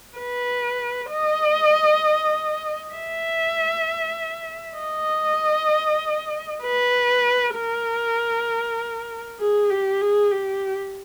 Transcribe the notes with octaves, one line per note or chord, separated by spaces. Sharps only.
B4
D#5
E5
D#5
B4
A#4
G#4
G4
G#4
G4